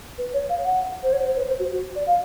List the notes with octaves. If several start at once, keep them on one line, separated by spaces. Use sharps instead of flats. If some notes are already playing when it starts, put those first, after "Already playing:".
B4
C#5
F5
F#5
C5
C#5
C5
B4
C5
F#4
F#4
D5
F5